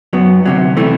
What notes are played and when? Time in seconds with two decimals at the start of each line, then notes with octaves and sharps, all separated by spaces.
0.13 F#2 F#3 B3
0.45 D2 C3 F#3
0.77 C3 E3 A3